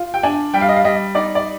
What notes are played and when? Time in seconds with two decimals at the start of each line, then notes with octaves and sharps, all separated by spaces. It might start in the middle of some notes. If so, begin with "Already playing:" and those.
Already playing: F4
0.14 G5
0.23 D4 G#5
0.54 G3 G5
0.61 F5
0.69 D#5
0.76 F5
0.84 G3 D#5
1.15 D#4 D5
1.35 D5